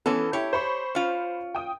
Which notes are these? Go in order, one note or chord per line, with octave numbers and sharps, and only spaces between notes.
E3 B3 C#4 A4
E4 G4 C#5
C5 B5 C#6
C#4 F4
G5 D#6